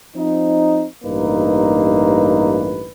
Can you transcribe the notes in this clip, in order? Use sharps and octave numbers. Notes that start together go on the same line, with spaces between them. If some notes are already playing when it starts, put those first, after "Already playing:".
F3 C4 D#4
A1 G2 A#3 D#4 B4